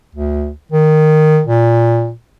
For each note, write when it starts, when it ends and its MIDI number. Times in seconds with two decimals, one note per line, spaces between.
0.15 0.51 38
0.72 1.42 51
1.47 2.12 46